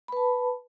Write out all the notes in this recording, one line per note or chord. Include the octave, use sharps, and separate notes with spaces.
B4 A5 B5